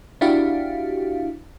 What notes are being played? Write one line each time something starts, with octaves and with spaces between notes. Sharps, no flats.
D4 E4 F#4 G4 F5